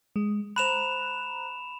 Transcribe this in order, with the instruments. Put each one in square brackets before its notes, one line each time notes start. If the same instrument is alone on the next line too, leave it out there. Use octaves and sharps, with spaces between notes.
[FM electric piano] G#3
[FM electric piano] C5 A#5 F#6 [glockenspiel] B5 E7 F7